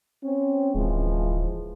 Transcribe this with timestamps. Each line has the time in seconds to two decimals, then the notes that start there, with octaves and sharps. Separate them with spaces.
0.24 C4 C#4
0.75 D1 E3 F3 G#3